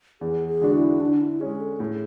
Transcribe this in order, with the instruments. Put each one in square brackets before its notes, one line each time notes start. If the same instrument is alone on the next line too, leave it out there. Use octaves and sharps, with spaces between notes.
[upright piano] E2 [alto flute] G#4
[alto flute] G#4
[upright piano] D3 G#3 D4 F#4
[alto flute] E4
[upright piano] D3 [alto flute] D4
[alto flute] E4
[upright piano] G#3 C#4 [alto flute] G#4
[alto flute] A4
[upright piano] A2 [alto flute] G#4